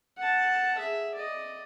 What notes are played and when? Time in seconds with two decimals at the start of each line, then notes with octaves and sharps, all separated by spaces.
0.17 F#5 A5
0.78 G#4 E5
1.15 D5 D#5